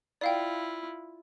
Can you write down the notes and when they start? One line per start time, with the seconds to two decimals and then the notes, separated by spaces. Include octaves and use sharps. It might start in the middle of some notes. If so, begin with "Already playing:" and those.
0.21 E4 F4 D5 F5 G5